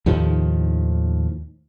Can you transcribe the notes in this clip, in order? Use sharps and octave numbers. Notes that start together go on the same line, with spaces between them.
D#2 A2 D#3 F3